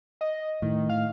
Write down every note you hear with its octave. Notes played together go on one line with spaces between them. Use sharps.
D#5
A2 D#3
F5